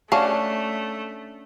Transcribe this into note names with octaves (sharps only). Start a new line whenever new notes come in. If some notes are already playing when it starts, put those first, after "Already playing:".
A3 C#4 D4 F#4 F5 A5